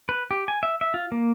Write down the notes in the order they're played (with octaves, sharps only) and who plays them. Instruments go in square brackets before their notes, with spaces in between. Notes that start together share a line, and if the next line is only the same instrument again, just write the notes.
[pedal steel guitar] B4
G4
G#5
E5
E5
F4
A#3